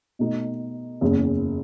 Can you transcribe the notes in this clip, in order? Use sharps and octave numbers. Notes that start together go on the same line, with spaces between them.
B2 A3 D#4
F#1 E2 C#3